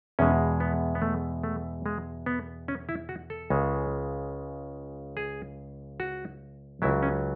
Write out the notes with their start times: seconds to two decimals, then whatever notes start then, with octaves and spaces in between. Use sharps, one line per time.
0.19 E2 B2 G#3 C#4
0.60 B3
0.95 B3
1.02 A3
1.43 A3
1.86 G#3
2.26 B3
2.68 C#4
2.89 E4
3.09 F#4
3.30 A4
3.50 C#2 C#3 G#3
5.17 G#4
6.00 F#4
6.82 C#2 C#3 F#3 E4
7.03 C#4